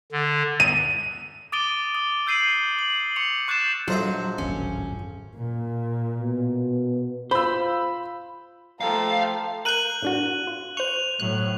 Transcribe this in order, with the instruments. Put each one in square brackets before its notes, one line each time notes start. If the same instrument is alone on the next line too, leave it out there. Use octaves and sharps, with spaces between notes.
[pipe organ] D3
[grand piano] D#7
[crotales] D6 D#6 A6 D7 D#7 G7
D#6
E6 G6 C7 D#7 F#7
F#7
C#6 C#7 F7
C#6 F#6 G6 A6 C7 E7
[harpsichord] A#1 C5 E5 [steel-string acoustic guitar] F#3 [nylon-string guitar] F4 A4 D#5
[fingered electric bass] D1 G#1 F#2 [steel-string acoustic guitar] C#4
[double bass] A#2
[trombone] B2
[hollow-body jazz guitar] F4 C5 [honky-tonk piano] B5 E6
[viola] F3 A3 [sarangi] A4 [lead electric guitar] F5 [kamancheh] G5 A#5
[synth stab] A#4 G6 [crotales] F#6 D#7 F#7
[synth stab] A2 D4 F#4
F4
[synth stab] C5 C#6 [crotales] F7
[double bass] A2 F#3 [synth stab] F#6